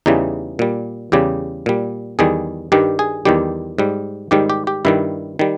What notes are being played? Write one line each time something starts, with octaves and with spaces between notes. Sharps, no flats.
E2 C#3 E3 G3 D#4
A#2 G3
E2 C#3 G3 G4
A#2 G3
E2 D#3 G3 G#4
G2 D#3 G3 G4
G#4
E2 D#3 G3 G4
G#2 G3
G#2 D#3 G3 G4
G4
G4
G2 D#3 G3 E4
D#3 G3